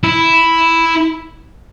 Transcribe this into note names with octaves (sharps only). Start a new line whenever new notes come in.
E4